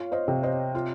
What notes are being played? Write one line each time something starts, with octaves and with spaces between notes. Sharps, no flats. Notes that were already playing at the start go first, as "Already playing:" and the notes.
Already playing: F4 C#5 F5
C5 D#5
C3
C5 D#5
F4